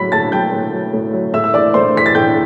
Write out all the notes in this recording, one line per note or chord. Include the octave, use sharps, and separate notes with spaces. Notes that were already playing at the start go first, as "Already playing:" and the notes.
Already playing: A2 F#3 B5 B6
A2 A5 A6
F#3 G5 G6
A2
F#3
A2
F#3
A2 E5 E6
E6
E3 D5 D6
A2 C5 C6
E3 B6
A6
A2 G5 G6